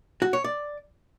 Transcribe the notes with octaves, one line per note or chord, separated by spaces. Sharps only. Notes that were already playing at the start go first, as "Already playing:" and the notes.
F#4
C#5
D5